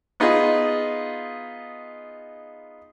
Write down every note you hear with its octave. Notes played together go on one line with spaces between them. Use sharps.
B3 D#4 F4 G#4